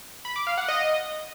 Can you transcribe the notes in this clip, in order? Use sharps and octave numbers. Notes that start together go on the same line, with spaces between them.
B5
D6
F5
F#5
D#5